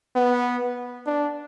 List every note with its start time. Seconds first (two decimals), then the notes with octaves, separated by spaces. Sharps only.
0.16 B3
1.07 D4